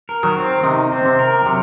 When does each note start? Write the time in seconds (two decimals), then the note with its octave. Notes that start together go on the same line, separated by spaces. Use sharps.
0.09 A#4
0.23 D#3 F#3
0.37 C4
0.64 C3 D#3 D#4
0.91 C4
1.05 C3
1.19 A#4
1.46 C3 F#3